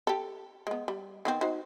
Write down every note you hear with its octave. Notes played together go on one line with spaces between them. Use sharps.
G4 A4
G#3 B3
G3
D#3 B3 C4
D#4 F#4 C5